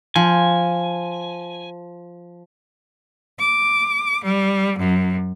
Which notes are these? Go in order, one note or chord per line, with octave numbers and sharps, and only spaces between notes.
F3 G#5
D6
G3
F#2